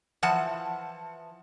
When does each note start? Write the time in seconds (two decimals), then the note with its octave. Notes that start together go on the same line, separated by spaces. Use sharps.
0.23 E3 F3 F#5 A5